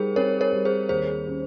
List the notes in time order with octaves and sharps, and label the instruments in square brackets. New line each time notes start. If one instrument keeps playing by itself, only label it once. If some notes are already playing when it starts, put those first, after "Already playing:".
Already playing: [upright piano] G3 D#4 [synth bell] G#4 A#4 C5
[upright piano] C4 [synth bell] A#4 C#5
[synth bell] A#4 C#5
[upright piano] G3
[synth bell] G#4 C5
[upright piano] D#2 [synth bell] G#4 C5
[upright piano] C#4